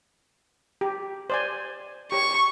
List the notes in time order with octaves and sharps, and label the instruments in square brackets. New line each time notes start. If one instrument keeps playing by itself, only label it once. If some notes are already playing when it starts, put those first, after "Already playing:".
[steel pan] G4
C5 D5 G#5
[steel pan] G4 C#5 [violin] C#6